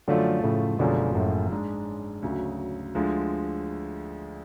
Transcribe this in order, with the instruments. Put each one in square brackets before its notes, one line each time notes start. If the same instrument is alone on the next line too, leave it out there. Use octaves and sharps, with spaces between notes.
[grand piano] F#2 F3 A3 F4 [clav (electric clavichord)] D3 F#3
[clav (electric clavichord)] A2 C#3
[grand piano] F#1 F#2 F3 G#3 [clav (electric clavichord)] B2 D3
[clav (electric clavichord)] F#2 A2
[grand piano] G#2 G#3 D4
D2 C#3 F#3
D2 D3 F3 G#3